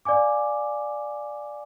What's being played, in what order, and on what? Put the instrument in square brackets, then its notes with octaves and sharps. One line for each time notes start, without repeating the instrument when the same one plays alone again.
[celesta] D5 F5 G#5 D6